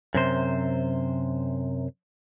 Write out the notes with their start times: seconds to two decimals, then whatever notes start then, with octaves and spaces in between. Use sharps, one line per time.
0.14 F#2 C3 C5